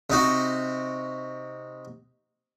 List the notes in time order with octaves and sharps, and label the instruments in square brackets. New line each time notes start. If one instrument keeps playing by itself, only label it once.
[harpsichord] C3 D#4 F#4